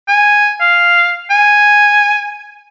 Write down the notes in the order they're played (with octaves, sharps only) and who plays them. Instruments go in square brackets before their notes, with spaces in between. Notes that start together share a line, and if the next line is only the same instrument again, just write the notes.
[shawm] G#5
F5
G#5